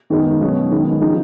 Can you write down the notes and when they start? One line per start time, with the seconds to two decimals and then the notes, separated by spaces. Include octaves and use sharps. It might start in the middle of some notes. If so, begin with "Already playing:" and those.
0.10 F#2 D#3 G#3 B3 D#4
0.41 B2 F#3 C#4
0.71 D#3 G#3 B3
1.01 C#3 F3 G#3 D#4